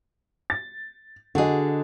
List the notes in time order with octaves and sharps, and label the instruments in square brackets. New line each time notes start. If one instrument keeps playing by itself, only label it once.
[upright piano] A6
[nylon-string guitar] D3 G#4 [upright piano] F#4 D#5